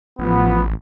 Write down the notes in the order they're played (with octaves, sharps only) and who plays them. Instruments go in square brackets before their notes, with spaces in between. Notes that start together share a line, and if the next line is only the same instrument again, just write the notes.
[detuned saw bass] A1 [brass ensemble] F3 B3